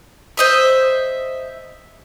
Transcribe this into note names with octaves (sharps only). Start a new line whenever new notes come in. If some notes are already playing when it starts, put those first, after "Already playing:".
C5 D#5 E5